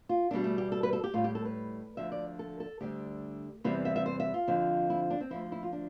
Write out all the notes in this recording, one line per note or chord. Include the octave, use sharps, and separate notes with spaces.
F4
E2 B2 G3 D4
A3
G4
A4
B4
A4
G4
A2 G3 F4
G4
A4
B4
D2 D3 F3 E5
D5
A4
A4
D2 D3 G3 G4
E2 C3 E3 G3 E4
E5
E5
C5
E5
F4
F2 D3 F3
E4
D4
C4
D2 D3 F3 E4
E4
F4
D4